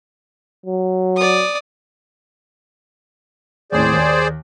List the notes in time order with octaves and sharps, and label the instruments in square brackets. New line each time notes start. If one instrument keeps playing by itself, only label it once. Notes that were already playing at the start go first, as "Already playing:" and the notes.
[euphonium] F#3
[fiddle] D5 D#6
[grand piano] D#2 A2 C4 [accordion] G#4 C5 D5
[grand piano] D#2